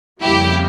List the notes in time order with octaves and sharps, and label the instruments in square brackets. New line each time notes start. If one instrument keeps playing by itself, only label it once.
[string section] F2 C#3 G3 A#3 E4 G4